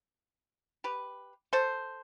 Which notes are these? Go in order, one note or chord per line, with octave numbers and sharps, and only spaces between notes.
G4 B4
A4 C5